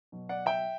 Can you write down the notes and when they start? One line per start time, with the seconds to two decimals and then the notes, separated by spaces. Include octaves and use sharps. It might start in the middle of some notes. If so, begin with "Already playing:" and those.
0.12 B2 F#3
0.29 D5 F#5
0.46 E5 G5